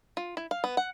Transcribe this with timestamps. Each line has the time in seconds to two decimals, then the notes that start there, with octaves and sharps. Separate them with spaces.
0.17 F4
0.37 E4
0.51 F5
0.64 B3
0.77 F#5